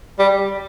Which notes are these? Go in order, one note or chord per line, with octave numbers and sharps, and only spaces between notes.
G3